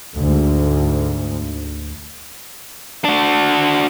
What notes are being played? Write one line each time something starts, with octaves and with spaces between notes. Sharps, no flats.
D2 G#2
D4 F#4